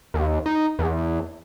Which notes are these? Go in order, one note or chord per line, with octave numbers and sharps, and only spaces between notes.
D#2
D#4
E2